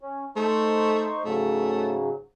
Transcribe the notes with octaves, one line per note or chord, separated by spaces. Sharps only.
C#4
A3 D#4 C5 C#6
G#2 C#3 F#3 A3